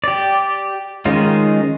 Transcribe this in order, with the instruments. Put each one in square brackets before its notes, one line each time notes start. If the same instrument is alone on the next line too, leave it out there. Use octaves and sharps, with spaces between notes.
[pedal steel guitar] G4 D5
D#3 G#3 C#4 D#4 F4